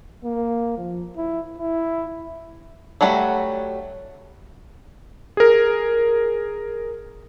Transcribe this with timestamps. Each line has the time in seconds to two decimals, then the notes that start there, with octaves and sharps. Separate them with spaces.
0.24 A#3
0.77 F3
1.17 E4
1.59 E4
3.01 F#3 G3 A3 F#4
5.37 G#4 A#4